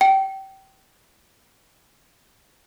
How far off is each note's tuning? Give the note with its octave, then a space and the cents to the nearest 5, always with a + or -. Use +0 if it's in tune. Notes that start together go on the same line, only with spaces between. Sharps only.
G5 -25